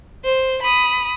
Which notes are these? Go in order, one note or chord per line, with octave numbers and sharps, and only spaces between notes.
C5
B5 D#6